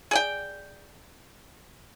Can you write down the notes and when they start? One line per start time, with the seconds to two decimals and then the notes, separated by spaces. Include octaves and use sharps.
0.11 G#4 D5 G5